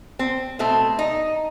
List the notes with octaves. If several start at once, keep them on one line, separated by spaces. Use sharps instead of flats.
C4
B2 A3 C4
D#4